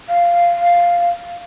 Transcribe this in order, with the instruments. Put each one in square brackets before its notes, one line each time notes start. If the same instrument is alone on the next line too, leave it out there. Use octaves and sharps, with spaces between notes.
[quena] F5